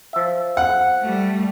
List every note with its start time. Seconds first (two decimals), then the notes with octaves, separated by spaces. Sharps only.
0.13 F3 E5
0.57 F#5
1.01 G3 A3